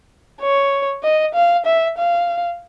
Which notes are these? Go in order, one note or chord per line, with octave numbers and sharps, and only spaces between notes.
C#5
D#5
F5
E5
F5